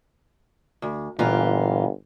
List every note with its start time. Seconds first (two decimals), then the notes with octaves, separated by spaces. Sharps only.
0.82 D2
1.19 G1 A#2 E3 F4